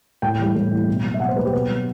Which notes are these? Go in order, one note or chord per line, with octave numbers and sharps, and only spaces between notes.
A2 G5
E3 G3
A2
E3 G3
B2
F#3
E5
B2 F#5
C5
F#3 B4
G4
B2 B4
F#3